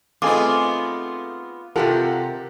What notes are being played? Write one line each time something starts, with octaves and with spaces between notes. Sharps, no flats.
A3 B3 C4 D#4 F4 G#4 G#5 D6
C3 F4 G4 A4 A#4 F#5